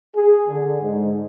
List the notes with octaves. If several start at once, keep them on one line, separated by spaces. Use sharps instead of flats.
G#4
D3
G#2